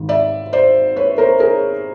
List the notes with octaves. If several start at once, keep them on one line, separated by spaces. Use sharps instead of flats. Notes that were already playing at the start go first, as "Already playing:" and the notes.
Already playing: G#1 G#2 D#3
D5 E5
C5 D5
B4 C#5
A#4 C5
G#4 A#4